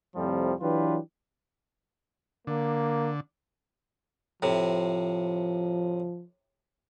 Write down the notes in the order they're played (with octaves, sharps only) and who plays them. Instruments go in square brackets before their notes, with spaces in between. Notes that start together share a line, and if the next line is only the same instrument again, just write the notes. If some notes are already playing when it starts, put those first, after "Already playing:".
[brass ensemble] F2 A2 C3 F3 G3
E3 F#3 D4 F4 G4 B4
[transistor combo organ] D3 [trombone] A#3
[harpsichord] A2 C3 [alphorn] F3